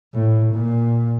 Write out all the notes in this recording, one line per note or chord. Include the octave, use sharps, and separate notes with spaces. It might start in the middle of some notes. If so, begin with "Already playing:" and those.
A2
A#2